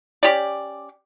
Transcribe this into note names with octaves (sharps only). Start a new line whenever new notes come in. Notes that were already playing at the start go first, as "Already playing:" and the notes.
C#4 G4 D5